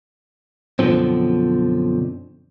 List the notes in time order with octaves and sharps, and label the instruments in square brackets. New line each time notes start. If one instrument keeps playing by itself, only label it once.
[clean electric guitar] F#2 B2 D3 D#3 F3 C4